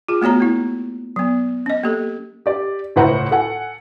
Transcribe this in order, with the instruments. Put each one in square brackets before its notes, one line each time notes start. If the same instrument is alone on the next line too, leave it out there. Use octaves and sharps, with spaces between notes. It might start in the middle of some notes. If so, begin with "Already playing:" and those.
[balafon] F4 G#4
A3 B3 F#4 C#5 A#5
A#3 E4
F#3 B3
C#4 D#5
A#3 G4 A4
[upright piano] G4 D5
C#2 A2 E4 C5 F#5 A#5
A4 F#5 G#5